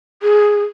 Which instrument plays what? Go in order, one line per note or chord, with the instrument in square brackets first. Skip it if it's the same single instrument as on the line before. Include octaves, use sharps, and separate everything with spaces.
[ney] G#4